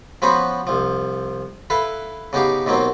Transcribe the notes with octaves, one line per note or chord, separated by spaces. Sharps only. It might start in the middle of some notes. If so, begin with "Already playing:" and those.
F3 B3 C#4 F#4 B4 C5
C2 F3
E4 A4 B4 F5
C#3 B3 D#4 G4 F5
D#2 B2 F#3 A#3 C4